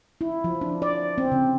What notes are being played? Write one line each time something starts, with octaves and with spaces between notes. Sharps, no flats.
E4
F3
D4
D5
C4
C#3